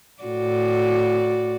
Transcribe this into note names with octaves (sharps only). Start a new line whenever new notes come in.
A2 F#4 D5